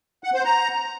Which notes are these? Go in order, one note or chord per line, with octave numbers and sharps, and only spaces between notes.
F#5
C5
A#5